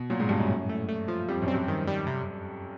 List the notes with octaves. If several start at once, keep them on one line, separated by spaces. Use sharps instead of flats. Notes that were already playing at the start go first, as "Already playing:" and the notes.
Already playing: B2
A#2 F#3
G#2
G2 C#3
F#2
A2
A3
A3
F3
F2 G3
F#2
C4
G2
D#3
G3
C3